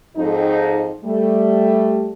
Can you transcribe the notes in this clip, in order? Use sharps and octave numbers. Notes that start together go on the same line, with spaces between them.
F2 G#2 D#4
G3 A3